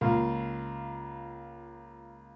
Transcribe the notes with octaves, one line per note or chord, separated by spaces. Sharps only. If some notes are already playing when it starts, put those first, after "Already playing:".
C#2 A#3 F4